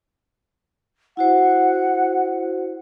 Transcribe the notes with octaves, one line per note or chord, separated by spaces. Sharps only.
E4 F#4 C5 F#5